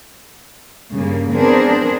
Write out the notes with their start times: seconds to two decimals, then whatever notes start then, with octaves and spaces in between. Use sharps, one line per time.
0.92 G2 C#3 A#3
1.33 B3 C4 D4 G#4 A#4 C5